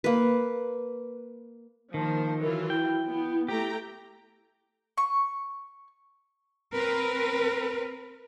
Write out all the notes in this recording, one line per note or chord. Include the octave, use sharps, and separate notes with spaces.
A#3 B4
D#3 F3 A#3 C5 A5
E3 F#3 F4 A#4
E4 G5
B3
A3 G4 G5 A#5
C#6
C4 A#4 B4